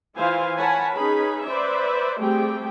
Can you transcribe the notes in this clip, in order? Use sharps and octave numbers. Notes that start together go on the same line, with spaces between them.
E3 E4 F4 C5 F5 G#5
A#4 C#5 F#5 G#5 A5 B5
C#4 D#4 G#4 B4 B5
B4 C5 D5 E5
G3 A3 C4 G4 G#4 G5